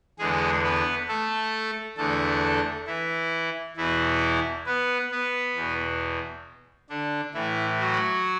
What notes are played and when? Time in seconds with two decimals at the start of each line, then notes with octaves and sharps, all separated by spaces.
0.19 E2 D3 G#3 G#4
0.63 B3 B4
1.08 A3 A4
1.97 E2 D3 A3 A4
2.87 E3 E4
3.77 E2 B2 E3 E4
4.66 B3 B4
5.11 B3 B4
5.56 E2 B2
6.90 D3 D4
7.34 A2 E3 E4
7.79 F#3 F#4